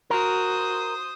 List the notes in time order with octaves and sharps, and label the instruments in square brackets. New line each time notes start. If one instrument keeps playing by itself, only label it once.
[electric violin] F#4 [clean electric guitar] A#4 [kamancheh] C5 D#6